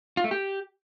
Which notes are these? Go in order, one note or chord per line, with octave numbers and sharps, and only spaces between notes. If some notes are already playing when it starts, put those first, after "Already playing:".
F4
A3
G4